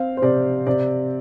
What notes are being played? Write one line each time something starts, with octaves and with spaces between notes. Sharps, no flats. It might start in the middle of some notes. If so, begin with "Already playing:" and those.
Already playing: C4 F5
C5
C3 D5
C3 D5